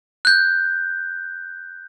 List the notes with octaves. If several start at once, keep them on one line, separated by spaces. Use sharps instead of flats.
F#6 G6